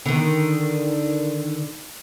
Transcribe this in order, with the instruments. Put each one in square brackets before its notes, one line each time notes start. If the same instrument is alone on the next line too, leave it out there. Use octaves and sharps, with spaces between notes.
[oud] D3 D#3